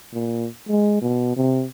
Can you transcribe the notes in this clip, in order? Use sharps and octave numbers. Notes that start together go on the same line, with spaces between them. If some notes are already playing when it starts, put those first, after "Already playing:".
A#2
G#3
B2
C3